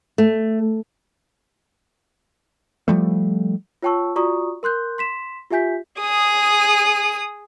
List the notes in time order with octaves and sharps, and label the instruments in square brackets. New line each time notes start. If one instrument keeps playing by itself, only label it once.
[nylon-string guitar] A3
[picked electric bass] F3 G3 A3
[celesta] F4 C#5 G5 A5 C#6 E6
F4 F#4 D5 A#5 C#6 D#6
A#4 C6 F#6 G6
C6 B6 E7
F4 G4 E5 G#5 G6 B6
[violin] G#4 D#6